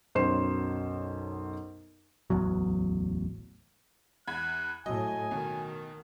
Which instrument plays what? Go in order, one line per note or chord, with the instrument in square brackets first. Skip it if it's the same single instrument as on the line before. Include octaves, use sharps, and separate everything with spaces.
[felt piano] B1 F#2 C5 C6 C7 E7
[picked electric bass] D1 A1 E2 F#3
[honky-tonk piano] E2 B5 G#6 [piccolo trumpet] F#6
[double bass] A2 [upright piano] F#3 [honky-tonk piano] D#5 [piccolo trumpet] G#5
[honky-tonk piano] B2 [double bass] D#3